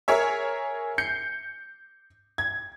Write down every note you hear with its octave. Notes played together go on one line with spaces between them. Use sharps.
G#4 A#4 C#5 E5
G6 C7 C#7
G#6